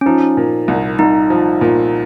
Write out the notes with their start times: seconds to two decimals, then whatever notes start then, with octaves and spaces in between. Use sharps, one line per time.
0.01 C#4
0.06 F3 D#4
0.37 A#2
0.68 C2
0.99 C2 D#4
1.30 F3
1.61 A#2